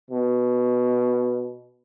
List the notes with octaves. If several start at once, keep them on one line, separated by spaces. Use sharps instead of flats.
B2